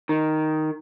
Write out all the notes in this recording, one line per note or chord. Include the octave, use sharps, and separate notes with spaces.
D#3